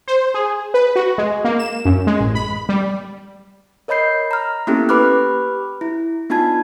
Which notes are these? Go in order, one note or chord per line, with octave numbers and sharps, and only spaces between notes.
C5
G#4
B4
F#4
G#3
A#3
E7
F#2
G#3
A1
B5
G3
A#4 C#5 D#5 B5 G6 C7
A#5 F6
A#3 B3 C#4 E4 G4 A4
G4 B4 B5 D6 F6 F#6
E4
B3 D4 D#4 F4 A5 G#6